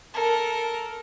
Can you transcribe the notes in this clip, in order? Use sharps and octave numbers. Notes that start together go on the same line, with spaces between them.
A4 A#4